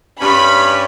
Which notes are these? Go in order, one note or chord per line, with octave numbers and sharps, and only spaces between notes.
G2 C#4 B5